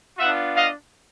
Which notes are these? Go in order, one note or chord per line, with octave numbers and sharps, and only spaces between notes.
B3 D4 F4 E5 F#5
D#5 F5